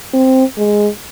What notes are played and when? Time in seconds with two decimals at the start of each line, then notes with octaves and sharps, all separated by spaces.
0.14 C4
0.57 G#3